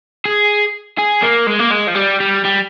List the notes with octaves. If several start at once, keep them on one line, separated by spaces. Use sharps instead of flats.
G#4
G#4
A#3
G#3
A#3
G#3
F3
G3
G3
G3